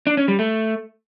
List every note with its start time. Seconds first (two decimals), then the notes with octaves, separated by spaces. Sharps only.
0.07 D4
0.17 C#4
0.28 G3
0.39 A3